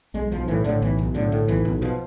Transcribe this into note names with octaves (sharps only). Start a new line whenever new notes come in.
B1 G#3
B1 F3
A2 E3
A2 D3
B1 E3
B1
A2 D3
A2
B1 E3
B1
B2 F3